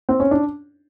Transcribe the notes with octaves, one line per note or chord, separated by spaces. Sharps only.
C4
C#4
D4